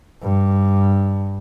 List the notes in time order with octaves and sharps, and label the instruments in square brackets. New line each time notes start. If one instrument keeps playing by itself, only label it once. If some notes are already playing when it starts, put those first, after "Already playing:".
[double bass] G2